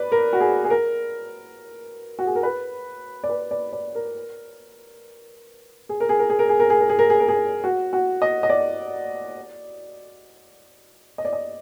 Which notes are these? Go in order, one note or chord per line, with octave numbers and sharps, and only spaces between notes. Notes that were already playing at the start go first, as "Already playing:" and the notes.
Already playing: B4 D5
A#4
F#4
G#4
G#4
A#4
F#4
G#4
A#4
B4
D5
B4
D5
D5
A#4
G#4
A#4
G#4
A#4
G#4
A#4
G#4
A#4
G#4
A#4
G#4
A#4
G#4
A#4
G#4
F#4
F#4
D#5
D#5
D5
D#5
D5
D#5